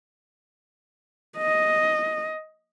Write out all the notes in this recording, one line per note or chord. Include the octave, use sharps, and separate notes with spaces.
D#5